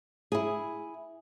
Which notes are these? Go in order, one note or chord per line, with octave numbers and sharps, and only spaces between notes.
E4 G#4